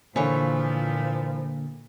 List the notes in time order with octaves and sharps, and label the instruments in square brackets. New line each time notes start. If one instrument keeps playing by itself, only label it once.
[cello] A#2 [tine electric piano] D3 A#3 [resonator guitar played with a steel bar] E3 C#5 [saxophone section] F3